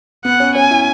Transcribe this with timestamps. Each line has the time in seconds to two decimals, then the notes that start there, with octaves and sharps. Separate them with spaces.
0.25 B3 F#5
0.40 C#4
0.55 C#4 G#5
0.71 E4